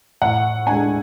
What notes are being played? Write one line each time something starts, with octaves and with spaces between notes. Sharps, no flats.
A2 F#5
G#3 D4 G#5